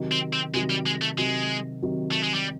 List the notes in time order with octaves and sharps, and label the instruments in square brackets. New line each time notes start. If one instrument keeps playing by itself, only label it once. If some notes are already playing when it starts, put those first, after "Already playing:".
Already playing: [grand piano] C3 D#3 F#3
[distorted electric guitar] C4
C4
[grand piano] C3 D#3 F#3 [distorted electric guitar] G#3
[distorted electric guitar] G3
G#3
A3
[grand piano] C3 D#3 F#3 [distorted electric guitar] G#3
[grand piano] C3 D#3 F#3
[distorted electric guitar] A3
G#3
G3